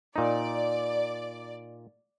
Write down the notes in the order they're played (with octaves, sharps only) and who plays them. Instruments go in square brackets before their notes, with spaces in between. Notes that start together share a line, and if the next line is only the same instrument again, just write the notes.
[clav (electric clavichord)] A#2 D#4 [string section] D5